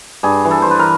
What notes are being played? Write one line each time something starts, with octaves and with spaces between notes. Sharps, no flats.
G2 G#4
E3
A4
E3 C5
B4
A#4